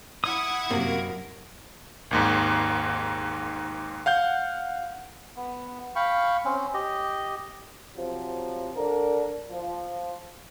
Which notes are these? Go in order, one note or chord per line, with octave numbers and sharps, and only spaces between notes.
E4 F#5 D#6 G#6
F#2 C3 A#3 A#4
G#1 D#2 G#2
F5 F#5 G6
B3
F5 G5 B5 C#6
C4 C#4
G4 D#5
C3 F3 F#3
D3 D4 A#4
F3